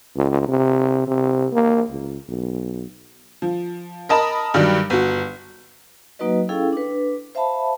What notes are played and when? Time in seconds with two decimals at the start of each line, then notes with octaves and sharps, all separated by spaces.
0.16 C#2
0.48 C3
1.07 C3
1.53 A#3
1.91 C#2
2.28 B1
3.42 F3
4.09 A#4 D#5 A5 B5
4.54 G2 D#3 F#3 G3
4.90 G1 F#4
6.19 F#3 A#3 D#4 F#4 B4 D#5
6.49 C#4 E4 G#4 A4 F5 G5
6.73 D4 B4
7.35 C5 E5 F5 A5 B5